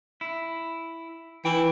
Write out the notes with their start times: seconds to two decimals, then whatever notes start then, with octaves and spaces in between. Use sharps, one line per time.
0.21 E4
1.45 E3 E4 G5